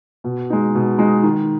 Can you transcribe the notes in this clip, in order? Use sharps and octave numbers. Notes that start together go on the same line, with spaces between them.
B2
G#3 D#4
B2
G#3 D#4
D#3